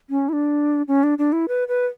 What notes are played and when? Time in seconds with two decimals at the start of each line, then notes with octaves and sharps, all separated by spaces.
0.10 C#4
0.29 E4
0.33 D4
0.88 C#4
1.03 D4
1.18 D4
1.33 E4
1.48 B4
1.68 B4